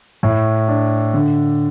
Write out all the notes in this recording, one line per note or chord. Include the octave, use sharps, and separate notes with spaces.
A2
D4
D3